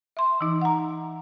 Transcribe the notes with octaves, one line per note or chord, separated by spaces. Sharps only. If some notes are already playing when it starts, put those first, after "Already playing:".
E5 C6
E3 D#4
F#5 A#5